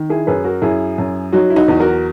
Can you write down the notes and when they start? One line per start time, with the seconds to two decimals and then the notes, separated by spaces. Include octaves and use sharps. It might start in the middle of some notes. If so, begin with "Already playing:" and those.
Already playing: D#3
0.10 E4 G#4
0.27 F#2 G#4 B4
0.44 F#4 A#4
0.62 F#2 E4 G#4
0.98 F#2
1.33 F#3 D#4 F#4
1.50 E4
1.56 D#4 F#4
1.68 E2
1.79 F#4 A#4